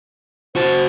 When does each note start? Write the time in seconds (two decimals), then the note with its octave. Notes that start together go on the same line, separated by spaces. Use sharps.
0.56 F#4 C5 A5